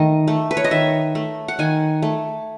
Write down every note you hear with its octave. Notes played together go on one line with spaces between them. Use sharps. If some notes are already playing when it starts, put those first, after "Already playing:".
Already playing: D#3 A3 D#5
A3
B4
C#5
D#5
D#3 E5
A3
F#5
D#3 G#5
A3